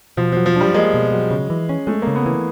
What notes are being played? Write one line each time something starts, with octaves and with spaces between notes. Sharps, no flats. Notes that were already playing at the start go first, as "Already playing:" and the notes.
B2 F3
F3 F#3
F3
G3 D4
G#3 A#3
B2
F#3
C#3
E3
C#4
G#3 A3
C#3 A#3
B3
E3